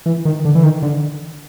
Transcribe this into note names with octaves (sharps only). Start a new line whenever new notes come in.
E3
D#3
D3
E3
D#3
D3